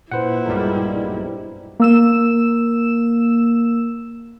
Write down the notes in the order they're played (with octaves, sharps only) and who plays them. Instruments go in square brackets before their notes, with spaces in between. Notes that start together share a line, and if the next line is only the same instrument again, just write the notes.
[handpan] A#2 B4 [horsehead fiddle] E4 [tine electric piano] C5 F#5
[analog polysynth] B1 G2 G3 [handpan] G#3 A#4
[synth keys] A#3 E6 E7